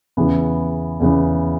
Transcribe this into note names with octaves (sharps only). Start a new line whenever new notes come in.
E2 C#3 E3 B3
E2 C#3 E3 B3